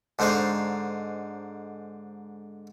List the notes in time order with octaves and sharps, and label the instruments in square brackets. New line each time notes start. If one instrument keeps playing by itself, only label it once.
[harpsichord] G#2 D3 D#4 C5 F5 C#6